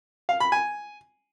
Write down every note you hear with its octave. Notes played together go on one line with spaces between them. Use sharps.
F5
B5
G#5